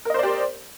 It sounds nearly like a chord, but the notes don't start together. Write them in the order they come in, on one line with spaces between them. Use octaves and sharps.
A#4 D#5 C5 D5 G4